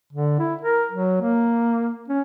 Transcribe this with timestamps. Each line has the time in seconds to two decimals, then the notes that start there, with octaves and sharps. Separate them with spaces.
0.13 D3
0.39 E4
0.61 A#4
0.92 F#3
1.22 A#3
2.08 C#4